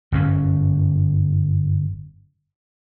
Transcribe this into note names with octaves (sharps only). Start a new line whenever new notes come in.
G1 F#2 C#4